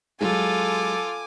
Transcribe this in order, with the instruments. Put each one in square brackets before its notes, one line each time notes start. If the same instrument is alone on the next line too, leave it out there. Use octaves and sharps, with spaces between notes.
[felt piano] F#3 G#3 [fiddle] F4 [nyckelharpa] A4 [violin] G#5 D6